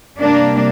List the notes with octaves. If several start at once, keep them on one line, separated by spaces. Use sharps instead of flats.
C3 G3 A#3 D4